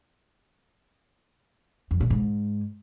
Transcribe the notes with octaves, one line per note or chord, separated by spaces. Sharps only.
F2
A#2
G#2